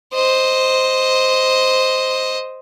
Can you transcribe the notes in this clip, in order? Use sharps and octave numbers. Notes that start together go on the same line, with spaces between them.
C5 D#5